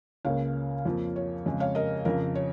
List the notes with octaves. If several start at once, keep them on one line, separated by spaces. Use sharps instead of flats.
C#2 C#3 A#3 C#5 F5
F2 F3 A#3
C#5
F2 C#3 G#3
C#5 F5
A#4 D#5
F2 C#3 F3 A#4
C#5